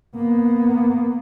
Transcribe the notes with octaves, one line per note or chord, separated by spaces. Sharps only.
A#3 B3